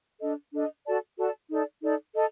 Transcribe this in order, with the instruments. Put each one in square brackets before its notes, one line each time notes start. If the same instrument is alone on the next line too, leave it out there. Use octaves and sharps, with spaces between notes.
[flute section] D4 A4 D#5
D4 A4 D#5
F#4 A4 D5 A5
F#4 A4 D5 A5
D#4 A4 D5
D#4 A4 D5
A4 D#5